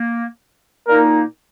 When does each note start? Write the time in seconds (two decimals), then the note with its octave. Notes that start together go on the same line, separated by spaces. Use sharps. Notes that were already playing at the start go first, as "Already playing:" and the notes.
Already playing: A#3
0.88 A#2 A#3 D#4 A#4